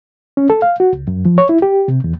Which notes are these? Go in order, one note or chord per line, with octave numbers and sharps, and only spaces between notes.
C#4
A4
F5
F#4
C#2
F#2
F3
C#5
E4
G4
C3
E2